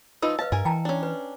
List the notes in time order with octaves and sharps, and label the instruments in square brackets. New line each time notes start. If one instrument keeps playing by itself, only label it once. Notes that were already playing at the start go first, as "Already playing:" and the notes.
[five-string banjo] F3 D#4 B4 [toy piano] E6
[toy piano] B4 D#5 F5 [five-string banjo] A5
[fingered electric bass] G2 [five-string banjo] A#4 G#5
[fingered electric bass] E3 [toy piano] G5 A5 A#5
[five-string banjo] C#4 D4
[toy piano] B4